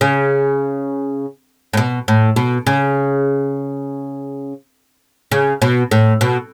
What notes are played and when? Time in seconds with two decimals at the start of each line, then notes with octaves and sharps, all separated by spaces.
0.01 C#3
1.73 A2
1.77 B2
2.08 A2
2.36 B2
2.67 C#3
5.32 C#3
5.62 B2
5.91 A2
6.21 B2